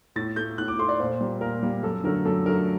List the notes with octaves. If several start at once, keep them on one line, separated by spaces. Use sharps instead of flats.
A2 A6
A3 G6
A2 F#6
D6
A3 C6
D5
A#2 C5
G3 A#3
A#2 A#4
G3 A#3
F#2 A4
D3 F#3 A3 A#4
F#2 A4
D3 F#3 A3 A#4